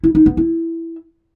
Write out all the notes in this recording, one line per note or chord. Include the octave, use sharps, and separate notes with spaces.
E4
D#4
B3
E4